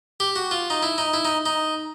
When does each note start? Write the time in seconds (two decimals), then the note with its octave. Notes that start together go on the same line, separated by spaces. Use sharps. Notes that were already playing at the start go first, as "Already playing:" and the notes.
0.20 G4
0.36 F#4
0.51 F4
0.70 D#4
0.83 E4
0.98 D#4
1.14 E4
1.25 D#4
1.46 D#4